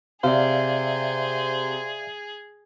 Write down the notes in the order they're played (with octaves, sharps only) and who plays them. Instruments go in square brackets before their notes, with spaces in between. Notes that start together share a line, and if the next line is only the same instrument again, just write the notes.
[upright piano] C3 [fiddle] G#4 [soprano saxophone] C5 [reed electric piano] D5 E5 F5